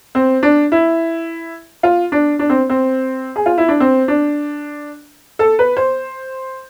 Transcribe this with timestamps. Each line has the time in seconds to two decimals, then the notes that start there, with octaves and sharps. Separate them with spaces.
0.15 C4
0.43 D4
0.72 E4
1.83 F4
2.12 D4
2.39 D4
2.50 C4
2.70 C4
3.36 G#4
3.46 F4
3.58 E4
3.68 D4
3.80 C4
4.08 D4
5.39 A4
5.59 B4
5.77 C5